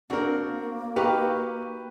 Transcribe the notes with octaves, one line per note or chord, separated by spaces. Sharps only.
A#3 C4 D4 F#4 A#4
D#4 F#4 G4 B4 F5 G5